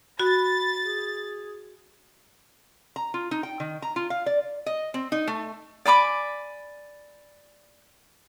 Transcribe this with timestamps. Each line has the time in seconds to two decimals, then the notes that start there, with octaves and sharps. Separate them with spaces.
0.20 F#4 B5 A6
0.83 G#4
2.96 A#5
3.14 F4
3.31 D#4
3.43 G5
3.60 D#3
3.82 A#5
3.96 F4
4.10 F5
4.26 D5
4.66 D#5
4.94 C4
5.12 D#4
5.28 A3
5.85 D5 G#5 B5 D6